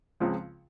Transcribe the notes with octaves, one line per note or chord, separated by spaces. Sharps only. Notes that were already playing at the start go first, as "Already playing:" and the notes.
C#2 C#3 F3 G#3 C4